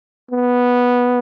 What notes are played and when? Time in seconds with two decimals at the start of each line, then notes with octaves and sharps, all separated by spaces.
0.31 B3